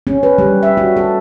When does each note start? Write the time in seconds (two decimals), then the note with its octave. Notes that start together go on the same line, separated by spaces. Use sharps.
0.07 C#4
0.23 B4
0.38 G3
0.63 E5
0.77 F#4
0.96 A4